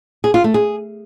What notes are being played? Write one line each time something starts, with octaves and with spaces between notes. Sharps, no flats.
G#4
F4
A3
G#4